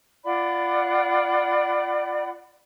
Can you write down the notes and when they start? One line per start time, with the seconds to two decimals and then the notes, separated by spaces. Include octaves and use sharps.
0.24 F4 D5 F#5 B5